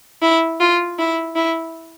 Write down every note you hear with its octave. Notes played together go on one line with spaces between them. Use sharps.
E4
F4
E4
E4